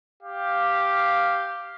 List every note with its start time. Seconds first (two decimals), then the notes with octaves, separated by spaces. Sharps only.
0.23 G4 F5